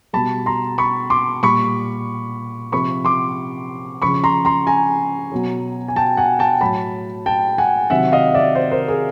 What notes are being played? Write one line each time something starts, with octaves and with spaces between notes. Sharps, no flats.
B2 G3 A5 B5
A#5 C6
B5 C#6
C6 D6
A#2 G3 B5 C#6
C3 F3 B5 C#6
C6 D6
C#3 F3 B5 C#6
A#5 C6
A#5 C6
G#5 A#5
B2 F#3
G#5
G5 A5
F#5 G#5
G5 A5
A2 F#3 A5 B5
G5 A5
F#5 G#5
C3 D#3 F#3 E5 F#5
D#5 F5
D5 E5
C5 D5
A#4 C5
G#4 A#4